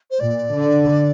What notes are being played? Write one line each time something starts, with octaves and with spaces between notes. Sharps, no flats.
C5
A#2 D5
D3